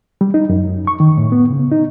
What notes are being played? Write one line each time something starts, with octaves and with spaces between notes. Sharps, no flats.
G3
D#4
F#2
C#6
D#3
A2
B3
C#3
D#4